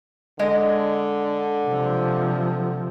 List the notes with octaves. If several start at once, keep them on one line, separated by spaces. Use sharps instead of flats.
D3 G#3 D#5
C3 F3